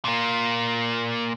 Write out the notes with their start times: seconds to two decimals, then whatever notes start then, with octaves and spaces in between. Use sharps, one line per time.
0.05 A#2 A#3